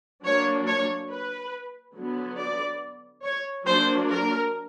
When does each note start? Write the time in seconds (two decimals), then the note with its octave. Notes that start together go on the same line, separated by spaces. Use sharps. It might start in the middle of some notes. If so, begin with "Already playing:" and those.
0.24 F#3 A#3 D4 C#5
0.67 C#5
1.10 B4
1.96 D3 F#3 B3
2.38 D5
3.24 C#5
3.66 F#3 A#3 D4 C5
4.09 A#4